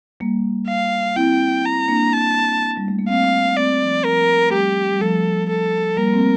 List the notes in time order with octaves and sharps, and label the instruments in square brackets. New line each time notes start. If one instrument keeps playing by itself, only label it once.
[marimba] G3 A#3
[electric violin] F5
[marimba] C4 E4 [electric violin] G5
[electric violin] A#5
[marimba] A#3 D4
[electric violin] A5
[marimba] G3
A3
A#3
[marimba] A3 C4 [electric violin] F5
[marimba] A3 C4 [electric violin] D5
[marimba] F3
[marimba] F3 [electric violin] A#4
[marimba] A3
[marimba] G3 [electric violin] G4
[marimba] G3
[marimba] F3 A3 [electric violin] A4
[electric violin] A4
[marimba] G3 A#3 [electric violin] A#4
[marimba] A#3
A3 C4